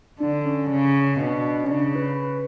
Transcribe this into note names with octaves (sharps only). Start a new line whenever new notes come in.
D3 D4
C#4
C#3
B2 D4
C#4
C#3 D4
B4